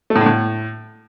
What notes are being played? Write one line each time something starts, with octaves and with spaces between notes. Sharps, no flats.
A3
A2
D3
A2